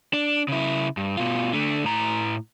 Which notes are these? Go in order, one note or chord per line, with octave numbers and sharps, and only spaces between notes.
D4
C#3 E4
G2
B2 F4
D3 A3
A2 A#5